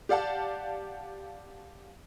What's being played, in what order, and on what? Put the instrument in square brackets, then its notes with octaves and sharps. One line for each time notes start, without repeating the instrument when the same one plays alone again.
[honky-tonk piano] G4 D5 F5 F#5 A5